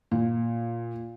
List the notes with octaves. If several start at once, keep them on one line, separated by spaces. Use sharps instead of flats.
A#2